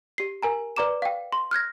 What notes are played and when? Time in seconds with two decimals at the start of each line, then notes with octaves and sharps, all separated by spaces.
0.18 G4 C7
0.43 A#4 G#5 A#5
0.76 B4 D5 A#5 D6 E7
1.02 F5 G5
1.32 C6
1.51 F6 F#6 G#6 A#6